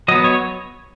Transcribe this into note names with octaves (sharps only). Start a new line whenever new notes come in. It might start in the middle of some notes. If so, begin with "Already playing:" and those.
F#3 B3 D#5
C#5